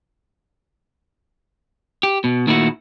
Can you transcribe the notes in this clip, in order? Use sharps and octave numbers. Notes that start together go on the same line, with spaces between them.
G4
B2
A#2 D#3 A3 A#3 E4 F#4